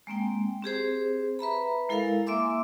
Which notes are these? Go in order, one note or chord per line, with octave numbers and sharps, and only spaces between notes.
G#3 A#3 C4 G5
C4 G4 G#4 C5
B4 E5 A#5 B5
G#3 E4 A4 A#4 F5
A#3 E5 G#5 C6 D6 E6